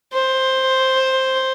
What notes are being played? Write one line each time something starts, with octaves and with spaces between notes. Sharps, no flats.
C5